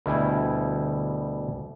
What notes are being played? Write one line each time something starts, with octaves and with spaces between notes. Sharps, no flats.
D2 B2 G3 E4 G#5